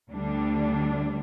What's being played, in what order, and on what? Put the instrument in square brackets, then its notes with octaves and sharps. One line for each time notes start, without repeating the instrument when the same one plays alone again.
[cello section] D2 D3 G3 D4